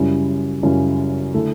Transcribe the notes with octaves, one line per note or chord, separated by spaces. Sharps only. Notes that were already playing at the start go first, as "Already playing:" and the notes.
Already playing: F#2 C#3 G3 C#4 E4
F#2 C#3 G3 C#4 E4
D3 A3 E4